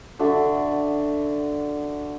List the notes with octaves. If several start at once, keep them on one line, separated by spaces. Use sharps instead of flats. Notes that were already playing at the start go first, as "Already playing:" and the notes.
D3 F#4 E5 A5